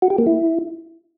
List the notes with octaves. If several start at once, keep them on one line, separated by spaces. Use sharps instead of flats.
F#4
G4
A#3
E4